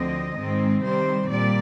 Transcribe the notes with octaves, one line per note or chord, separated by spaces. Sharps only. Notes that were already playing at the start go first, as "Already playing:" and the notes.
Already playing: D2 D3 F3 C4 D#5
G#2 D#3 G#3 C4
C3 D#3 G3 C4 C5
A#2 G3 D5